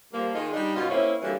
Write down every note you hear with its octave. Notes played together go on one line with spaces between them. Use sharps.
F3 G3 A#3
D#3 G#3 D#4 F4 G#4
G3 D4 D#4
F#2 B2 F4
A#3 C4 C#4 E4
D3 E3 F#3 G3 A#3